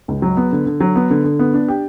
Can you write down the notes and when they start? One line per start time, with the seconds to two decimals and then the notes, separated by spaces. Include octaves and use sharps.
0.08 C#2
0.22 F#3
0.37 B3
0.52 D3
0.66 D3
0.80 F#3
0.96 B3
1.10 D3
1.24 D3
1.39 B3
1.54 D4
1.68 G4